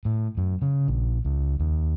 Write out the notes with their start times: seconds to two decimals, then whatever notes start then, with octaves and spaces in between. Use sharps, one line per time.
0.05 A2
0.37 F#2
0.62 C#3
0.88 A#1
1.25 C#2
1.59 D#2